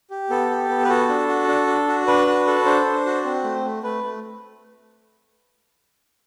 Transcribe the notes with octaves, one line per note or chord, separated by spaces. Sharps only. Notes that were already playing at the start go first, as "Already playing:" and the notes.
G4
B3 A4
G4
B3
B4
F#4 A4
D4
F#4
D4
D4
F#4
D4 B4
F#4
A4
D4 C5
D4
F#4
C4
A3
A3
A3 B4
A3